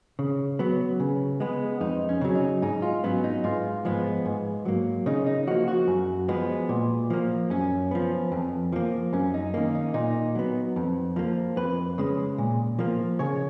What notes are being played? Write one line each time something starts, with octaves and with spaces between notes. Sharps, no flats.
C#3
F#3 B3
C#3
G#3 B3
F2 D#4
C#4
C#3 F#3
D#4
G#2 D#4
F4
F#3 B3 C#4
D#4
G#2 F4
F3 G#3 B3
G#2
F#3 A#3
C#3 D#4
D#4
F3 A#3 F#4
F#4
F#2
F3 G#3 B3
A#2
F3 A#3
F#2 C#4
F3 B3
F2
F3 A#3
F#2 C#4
D#4
D#3 A#3 C#4
D#4
A#2 D#4
F#3 B3
F2
F3 A#3
F2 B4
C#3 G#3
A#2
F3 A#3
C#3 C#5